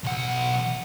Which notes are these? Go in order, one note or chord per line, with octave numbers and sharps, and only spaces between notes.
B1 F#5